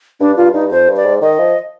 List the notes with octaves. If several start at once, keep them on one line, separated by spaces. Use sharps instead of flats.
G2 D4
G2 F4
G2 D#4
F2 C5
G2
D5
G#2
D#3 D#5
F3